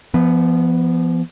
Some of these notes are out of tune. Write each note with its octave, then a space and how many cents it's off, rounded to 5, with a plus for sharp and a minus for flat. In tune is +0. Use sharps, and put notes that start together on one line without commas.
F3 -35 B3 +0